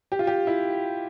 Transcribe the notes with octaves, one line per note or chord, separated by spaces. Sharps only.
G4
F4
G4
E4